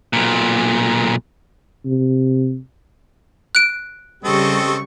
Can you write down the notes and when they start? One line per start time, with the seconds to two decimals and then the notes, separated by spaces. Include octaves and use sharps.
0.13 B1 A#2
1.85 C3
3.55 F#6 D7
4.25 C#3 G3 C4 A4 D#5 C#6